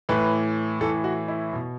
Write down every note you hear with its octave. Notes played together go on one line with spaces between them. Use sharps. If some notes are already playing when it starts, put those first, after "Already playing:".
A2 E3 B4
A2 E3 A4
F#4
E4
B2